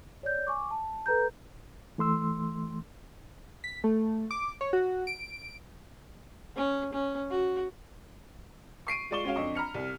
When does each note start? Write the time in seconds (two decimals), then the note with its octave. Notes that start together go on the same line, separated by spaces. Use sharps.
0.23 C#5 D5 G6
0.47 G#5 C#6 D6
0.71 A5
1.06 A4 B4 A#5 G6
1.98 E3 A3 C6 E6
3.64 B6
3.84 A3
4.31 D6
4.61 C#5
4.73 F#4
5.07 D7
6.56 C#4
6.93 C#4
7.31 F#4
8.87 C#6 C7 D7 D#7
9.11 G#3 F4 D5 C#6 E7 G7
9.24 G#3 C#4 F#4 C#5 F5
9.36 F2 D4 D#5 C#6
9.55 A#5 B5 F6 C#7
9.74 C2